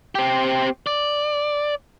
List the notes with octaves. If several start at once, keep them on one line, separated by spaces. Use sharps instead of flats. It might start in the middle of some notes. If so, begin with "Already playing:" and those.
C4 G4
D5